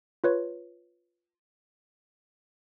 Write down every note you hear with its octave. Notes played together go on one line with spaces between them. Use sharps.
F4 B4 C#5